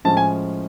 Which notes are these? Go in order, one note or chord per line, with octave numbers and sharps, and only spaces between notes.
A2 F3 G#3 C#4 A5
G#5